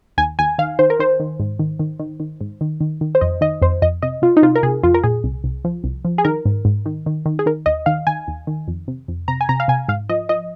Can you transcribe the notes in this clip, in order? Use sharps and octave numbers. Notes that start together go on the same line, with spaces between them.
D#2 G#5
D#2 G#5
D#3 F5
D#3 C5
A#4
D#3 C5
D#3
G#2
D#3
D#3
D#3
D#3
G#2
D#3
D#3
D#3
C5
F2 D#5
D#3 D#5
F2 C5
F2 D#5
C3 D#5
C3 F4
D#4
C3 F4
A#4
C3 G#4
F2 F4
A#4
A#2 G#4
C2
C2
F3
C2
F3
G#4
D#3 A#4
G#2
G#2
D#3
D#3
D#3
G#4
D#3 A#4
D#2 D#5
D#3 F5
D#3 G#5
D#2
D#3
F2
C3
F2
C3 A#5
G#5
C3 A#5
F5
C3 G#5
G#2 F5
F3 D#5
F3 D#5